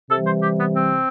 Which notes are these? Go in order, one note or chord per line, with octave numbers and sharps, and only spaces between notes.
C3 E3 G3 A4
C5
G4
B3
C4